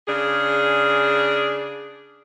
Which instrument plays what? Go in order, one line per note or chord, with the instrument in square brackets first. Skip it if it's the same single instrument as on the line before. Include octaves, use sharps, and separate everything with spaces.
[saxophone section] C#3 D4 G#4